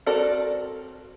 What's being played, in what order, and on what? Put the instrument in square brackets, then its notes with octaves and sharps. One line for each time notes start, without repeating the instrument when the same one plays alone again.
[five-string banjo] C4 F#4 A4 A#4 D5